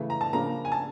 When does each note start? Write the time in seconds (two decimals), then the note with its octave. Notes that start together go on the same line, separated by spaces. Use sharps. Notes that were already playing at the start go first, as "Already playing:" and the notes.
Already playing: C#3 E3 A3
0.10 A#5
0.21 A5
0.33 C#3 F3 A#3 D4 A#5
0.65 G#5
0.72 A5